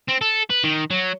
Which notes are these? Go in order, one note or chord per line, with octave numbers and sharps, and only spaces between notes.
C4
A4
B4
D#3
F#3